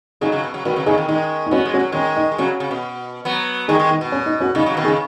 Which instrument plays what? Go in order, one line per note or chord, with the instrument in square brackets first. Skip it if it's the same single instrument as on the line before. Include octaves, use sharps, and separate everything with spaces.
[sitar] C#3 F#3 [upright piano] D#4 G#4
[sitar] C#3 F#3
B2
C#3 F#3
[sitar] B2 D#3 [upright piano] F#4 B4
[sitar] C#3 F#3
[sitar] C#3 F#3 [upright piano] D#4 G#4
[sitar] B2 D#3
[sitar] D#3 G#3 [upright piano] D#4
[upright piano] D#4
[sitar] B3 [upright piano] C#4 F#4
[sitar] G#3
[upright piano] C#4 F#4
[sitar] F#3
[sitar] D#3 G#3 [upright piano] C#4
[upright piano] D#4
[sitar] G#3
[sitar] C#3 F#3 [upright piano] C#4 F#4
[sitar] C#3
B2
F#3 B3
[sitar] D#3 G#3 [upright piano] D#4 G#4
[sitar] D#3 G#3
[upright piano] D#4
[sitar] B2
[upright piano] C#4
D#4
C#4 F#4
[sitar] C#3 [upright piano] D#4
[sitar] C#3 F#3
B2 D#3
[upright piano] D#4 G#4
[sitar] C#3